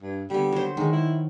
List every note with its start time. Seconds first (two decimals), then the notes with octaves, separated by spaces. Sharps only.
0.02 G2
0.30 D3 G3 B3
0.52 F#3 C5
0.77 D#3 G#3
0.92 E4